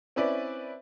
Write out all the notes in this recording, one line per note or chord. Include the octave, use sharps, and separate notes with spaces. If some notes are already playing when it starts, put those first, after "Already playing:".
C4 C#4 E4 B4 D5